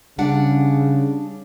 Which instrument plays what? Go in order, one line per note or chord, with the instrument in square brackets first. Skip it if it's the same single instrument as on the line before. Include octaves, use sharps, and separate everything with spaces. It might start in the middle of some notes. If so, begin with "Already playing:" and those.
[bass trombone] C#3 [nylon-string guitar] G3 D4 F#5